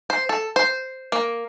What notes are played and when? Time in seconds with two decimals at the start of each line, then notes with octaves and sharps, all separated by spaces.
0.10 C5
0.29 A4
0.56 C5
1.12 A#3